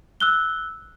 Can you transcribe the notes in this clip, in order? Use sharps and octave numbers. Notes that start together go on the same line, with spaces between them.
E6 F#6 G7